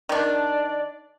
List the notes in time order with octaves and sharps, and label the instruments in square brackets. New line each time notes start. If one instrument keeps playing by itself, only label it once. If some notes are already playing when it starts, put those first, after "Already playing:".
[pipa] D#3 D4 [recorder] D5